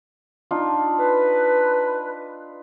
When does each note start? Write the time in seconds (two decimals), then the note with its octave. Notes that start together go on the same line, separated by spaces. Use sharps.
0.51 D4 D#4 F4
0.99 B4 A5